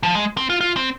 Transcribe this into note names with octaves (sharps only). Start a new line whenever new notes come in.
F3
G#3
C4
F4
F4
C4